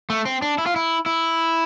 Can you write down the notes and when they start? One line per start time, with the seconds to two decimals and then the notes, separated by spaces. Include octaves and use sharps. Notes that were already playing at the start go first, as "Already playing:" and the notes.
0.10 A3
0.25 C4
0.42 D4
0.58 E4
0.66 F4
0.76 E4
1.06 E4